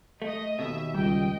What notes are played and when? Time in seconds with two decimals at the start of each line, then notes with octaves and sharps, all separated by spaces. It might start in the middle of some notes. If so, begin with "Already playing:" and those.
0.22 A3 D#5 D#6
0.59 D#2 B2 E5
0.94 C#2 G3 D#5 G5